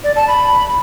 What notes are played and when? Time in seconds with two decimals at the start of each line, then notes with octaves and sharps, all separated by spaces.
0.04 D5
0.16 A5
0.28 B5